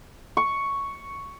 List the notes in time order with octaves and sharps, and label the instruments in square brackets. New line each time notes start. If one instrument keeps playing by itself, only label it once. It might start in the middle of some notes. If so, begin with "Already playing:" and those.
[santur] C#6